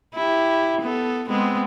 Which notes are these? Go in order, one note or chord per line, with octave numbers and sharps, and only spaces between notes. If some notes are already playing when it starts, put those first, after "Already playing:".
E4 G4
B3 A4
G#3 B3 C4